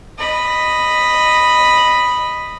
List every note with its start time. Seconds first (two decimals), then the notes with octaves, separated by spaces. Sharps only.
0.19 D#5 B5